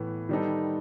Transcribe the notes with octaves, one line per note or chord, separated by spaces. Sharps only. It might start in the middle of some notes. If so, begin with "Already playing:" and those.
Already playing: A2 E3 B3
D#3 G3 B3 D#4 A4